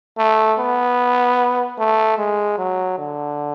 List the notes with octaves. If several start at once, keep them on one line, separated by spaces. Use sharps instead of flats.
A3
B3
A3
G#3
F#3
D3